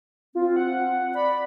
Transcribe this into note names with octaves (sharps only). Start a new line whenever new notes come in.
C4 F4
F#5
D5 B5